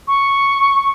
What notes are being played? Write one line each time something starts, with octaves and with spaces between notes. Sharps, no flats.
C#6